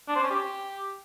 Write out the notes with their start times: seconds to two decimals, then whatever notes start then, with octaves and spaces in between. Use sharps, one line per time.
0.08 D4
0.16 C5
0.23 C#4
0.31 G4